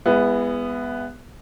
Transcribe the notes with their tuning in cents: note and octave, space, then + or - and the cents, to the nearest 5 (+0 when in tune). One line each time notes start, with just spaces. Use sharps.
G#3 -30 B3 +0 E4 +20